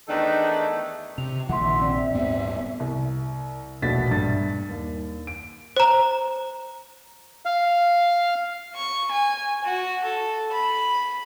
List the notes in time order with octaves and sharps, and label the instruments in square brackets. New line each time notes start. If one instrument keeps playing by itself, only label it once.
[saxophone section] E2 D#3 A3 D4 D#4 A4
[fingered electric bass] C3 [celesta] F7
[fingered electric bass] A#1 [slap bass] D#3 [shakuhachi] E5 [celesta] F#5 C6
[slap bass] C4 [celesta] D5
[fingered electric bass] D#1 G#2 B3
[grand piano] C2
E1 A#1 B2 A3 A6 B6
G2 A6
D#2
D7
[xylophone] C5 A#5
[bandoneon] F5
[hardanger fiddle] C#6
G#5
F#4
A4
B5